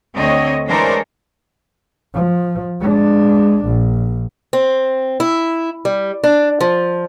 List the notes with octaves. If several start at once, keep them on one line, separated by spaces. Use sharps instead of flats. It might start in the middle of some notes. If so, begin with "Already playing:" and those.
D2 D3 C4 C#5 D#5
E3 G#3 D4 A#4 C5 C#5
F3
G#3 D4
A#1
C4
E4
G3
D4
F3